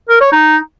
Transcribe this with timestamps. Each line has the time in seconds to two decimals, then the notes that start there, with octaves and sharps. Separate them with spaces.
0.10 A#4
0.21 C#5
0.33 D#4